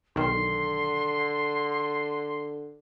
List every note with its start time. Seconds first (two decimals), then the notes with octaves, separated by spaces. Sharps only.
0.16 B1 D3 D#3 C6